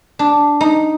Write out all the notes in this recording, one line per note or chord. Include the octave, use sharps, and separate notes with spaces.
D4
D#4